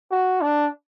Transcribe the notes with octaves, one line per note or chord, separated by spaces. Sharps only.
F#4
D4